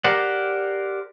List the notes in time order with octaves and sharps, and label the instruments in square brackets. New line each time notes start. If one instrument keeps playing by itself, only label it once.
[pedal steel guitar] G4 A#4 C5 D5 F#5